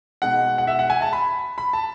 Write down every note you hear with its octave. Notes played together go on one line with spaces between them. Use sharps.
B2 G#3 D#4 F#5
F#5
E5
F#5
G#5
A5
B5
B5
A5